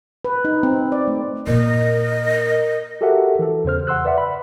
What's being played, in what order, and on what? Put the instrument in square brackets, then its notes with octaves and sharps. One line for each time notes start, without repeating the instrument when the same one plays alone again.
[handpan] B4
D#4
C4
D5
A3
[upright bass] A#2 E4 [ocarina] A#4 [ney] D#5
[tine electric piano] F#4 G4 A4 A#4 E5 F#5
E3 A4
E2 C#3 C5 F6
F#5 C6 E6 F#6
B4 D5 E5 F#5
B5